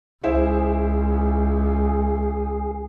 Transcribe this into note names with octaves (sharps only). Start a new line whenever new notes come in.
C#2 E4 G#4 C5 E5